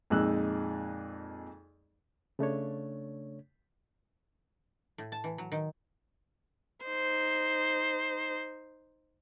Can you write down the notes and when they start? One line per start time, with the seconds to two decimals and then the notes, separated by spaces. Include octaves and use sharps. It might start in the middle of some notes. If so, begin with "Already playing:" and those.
0.10 F2 A#2 G#3 D#4 E6 F#6
2.39 C#3 A3 D4 C#5
4.98 A2
5.12 A5
5.24 E3
5.38 F#3
5.52 D#3
6.85 D#4 C5